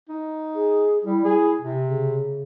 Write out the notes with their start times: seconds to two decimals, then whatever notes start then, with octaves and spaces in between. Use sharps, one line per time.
0.09 D#4
0.55 G#4
1.05 G3 E4
1.25 G#4
1.61 C3
1.85 C#3